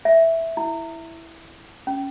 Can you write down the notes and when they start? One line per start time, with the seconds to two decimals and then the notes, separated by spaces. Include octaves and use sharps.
0.05 E5
0.57 E4
1.87 C#4